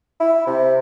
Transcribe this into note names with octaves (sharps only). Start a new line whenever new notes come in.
E4
C3